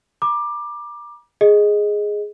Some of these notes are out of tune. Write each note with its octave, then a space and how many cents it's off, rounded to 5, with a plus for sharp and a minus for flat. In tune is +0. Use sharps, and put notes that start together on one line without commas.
A#5 +45 D6 +15
G#4 +0 D#5 +0